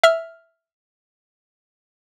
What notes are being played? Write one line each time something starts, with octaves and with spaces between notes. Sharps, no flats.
E5 F6